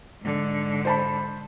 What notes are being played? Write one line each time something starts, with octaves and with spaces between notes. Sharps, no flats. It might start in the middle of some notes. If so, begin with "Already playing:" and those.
G#2 D3
C5 A5 B5